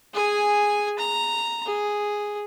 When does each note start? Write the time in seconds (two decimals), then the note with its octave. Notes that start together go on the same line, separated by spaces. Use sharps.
0.13 G#4 G#5
0.98 A#5
1.66 G#4